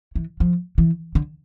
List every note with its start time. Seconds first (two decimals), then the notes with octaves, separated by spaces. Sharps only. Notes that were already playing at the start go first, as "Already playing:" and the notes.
0.15 E3
0.40 F3
0.78 E3
1.15 D3